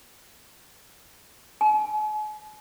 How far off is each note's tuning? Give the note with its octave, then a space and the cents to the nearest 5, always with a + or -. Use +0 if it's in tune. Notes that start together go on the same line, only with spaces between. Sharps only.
G#5 +45